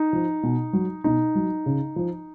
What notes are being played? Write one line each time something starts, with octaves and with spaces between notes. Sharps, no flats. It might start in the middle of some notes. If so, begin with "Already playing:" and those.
Already playing: D#4
F3
B2
F#3
B2 D#4
F#3
C#3
F3